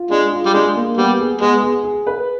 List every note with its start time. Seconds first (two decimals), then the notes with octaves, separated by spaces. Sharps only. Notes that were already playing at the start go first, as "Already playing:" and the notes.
Already playing: F4
0.10 G#3 D4
0.32 F4
0.46 G3
0.53 G#3 D4
0.75 A#3
0.97 G3 B3
1.19 G#4
1.41 G#3 B3
1.63 G#4
1.84 G#4
2.07 B4